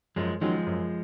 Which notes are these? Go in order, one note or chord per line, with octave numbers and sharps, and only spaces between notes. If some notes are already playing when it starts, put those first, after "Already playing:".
F#2 F3 G#3
D#3 F3 F#3 G#3 C#4
F#2